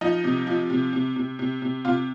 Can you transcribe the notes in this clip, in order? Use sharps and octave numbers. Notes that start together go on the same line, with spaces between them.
F3 D#4
C3
F3
C3
C3
C3
C3
C3
C3 F4